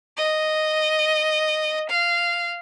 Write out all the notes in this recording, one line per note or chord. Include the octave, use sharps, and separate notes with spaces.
D#5
F5